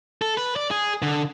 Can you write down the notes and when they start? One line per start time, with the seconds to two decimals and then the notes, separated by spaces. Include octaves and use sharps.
0.22 A4
0.37 B4
0.56 D5
0.71 G#4
1.02 D3